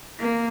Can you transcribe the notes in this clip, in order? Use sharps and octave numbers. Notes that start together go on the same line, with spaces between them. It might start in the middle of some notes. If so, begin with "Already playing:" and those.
A#3